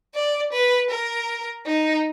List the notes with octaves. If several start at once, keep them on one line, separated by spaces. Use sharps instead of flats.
D5
B4
A#4
D#4